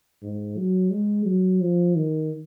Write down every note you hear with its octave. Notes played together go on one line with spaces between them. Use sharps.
G#2
F#3
G#3
F#3
F3
D#3